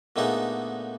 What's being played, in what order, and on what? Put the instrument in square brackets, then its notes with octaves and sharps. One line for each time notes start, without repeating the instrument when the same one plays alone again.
[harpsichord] A#2 D3 A3 B3 D#4 G#4